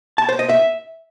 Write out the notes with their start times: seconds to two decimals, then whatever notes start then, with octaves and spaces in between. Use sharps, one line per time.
0.18 A5
0.29 C5
0.39 D#5
0.49 E5